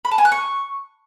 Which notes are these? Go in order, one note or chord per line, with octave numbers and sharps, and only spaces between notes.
B5
A5
G#5
F#6
C#6